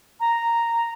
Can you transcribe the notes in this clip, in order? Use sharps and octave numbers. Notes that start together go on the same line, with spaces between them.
A#5